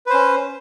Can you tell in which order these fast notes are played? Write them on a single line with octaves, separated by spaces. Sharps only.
B4 C5 C#4